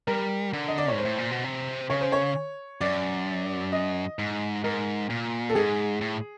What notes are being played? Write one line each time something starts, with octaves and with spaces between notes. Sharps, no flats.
G3 A#4
D3
D#5
D5
G#2 C#5
C5
A2
A#2
B2
C3
C#3 C#5
C5
C#5
F#2 D5
D#5
G#2
G#2 A#4
A#2
A4
G#2 G#4
A2